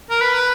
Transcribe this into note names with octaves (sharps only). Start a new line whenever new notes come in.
A#4
B4